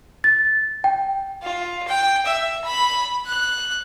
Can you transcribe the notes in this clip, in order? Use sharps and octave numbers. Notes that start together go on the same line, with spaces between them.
A6
G5
F4
G5
E5
B5
F#6